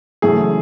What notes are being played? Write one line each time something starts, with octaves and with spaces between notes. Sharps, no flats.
F#1 F#2 E3 A3 G#4